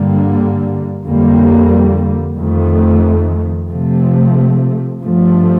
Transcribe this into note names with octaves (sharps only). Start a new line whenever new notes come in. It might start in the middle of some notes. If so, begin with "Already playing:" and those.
Already playing: G2 D3 G3 A#3
F2 D3 G3 A#3
F2 D#3 A3
C3 F3 A3
G2 F3 A3